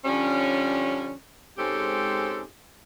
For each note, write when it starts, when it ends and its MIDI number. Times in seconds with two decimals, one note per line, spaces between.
0.05 1.13 50
0.05 1.13 53
0.05 1.13 55
0.05 1.13 61
1.58 2.43 44
1.58 2.43 56
1.58 2.43 60
1.58 2.43 61
1.58 2.43 67
1.58 2.43 69